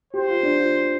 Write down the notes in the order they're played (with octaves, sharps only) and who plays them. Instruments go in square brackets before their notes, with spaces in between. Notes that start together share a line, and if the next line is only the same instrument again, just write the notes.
[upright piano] G4 [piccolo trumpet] C5
[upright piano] F4
D4
F4